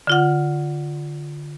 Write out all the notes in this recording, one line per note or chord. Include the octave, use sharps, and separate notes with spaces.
D3 F4 F#5